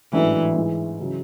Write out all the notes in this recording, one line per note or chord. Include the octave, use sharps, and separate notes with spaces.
A1 G#2 E3 F#3 A3 D4
G#2 E3 G#3
C#3 F#3